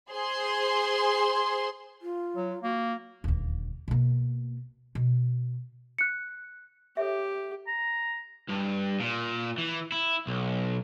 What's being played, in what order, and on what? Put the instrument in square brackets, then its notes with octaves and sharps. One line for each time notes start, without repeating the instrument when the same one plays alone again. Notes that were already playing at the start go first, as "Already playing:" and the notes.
[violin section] G#4 C5 C6
[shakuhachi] F4
[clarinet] F#3
[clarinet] A#3 [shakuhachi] F#4
[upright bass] D#1 D2
B2 A#3
B2
[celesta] F#6 C#7
[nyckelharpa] G4 [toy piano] A4 C#5 E5
[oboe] A#5
[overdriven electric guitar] G2
A#2
E3
E4
B1